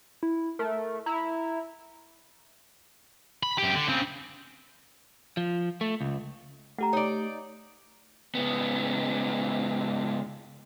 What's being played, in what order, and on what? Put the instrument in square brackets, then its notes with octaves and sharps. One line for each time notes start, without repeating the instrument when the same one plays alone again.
[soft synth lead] E4
[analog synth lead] A3 [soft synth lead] A#4
[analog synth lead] E4 [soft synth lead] A#5
[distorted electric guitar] B5
F#2 G4
D3
C#3 C4
[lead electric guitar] F3
A3
C#2
[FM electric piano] A3 G4 [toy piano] F#5 A#5
[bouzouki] D#4 D5 [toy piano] C#5
[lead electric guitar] C#2 B3